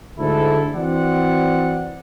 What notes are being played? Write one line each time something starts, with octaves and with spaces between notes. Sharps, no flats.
D2 G#2 D4 E4 A4
E3 C4 F#4 D5 F#5